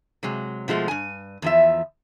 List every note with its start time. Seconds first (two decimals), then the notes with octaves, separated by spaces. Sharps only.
0.23 C3 F#3 G#3
0.68 B2 F3 G#3 A3
0.88 G2 G#5
1.42 E2 F3 E5